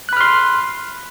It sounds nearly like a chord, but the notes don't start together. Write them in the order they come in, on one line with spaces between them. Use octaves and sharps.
F#6 B5 F6 C6